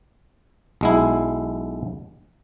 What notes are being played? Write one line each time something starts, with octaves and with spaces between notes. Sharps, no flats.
B1 G#3 E4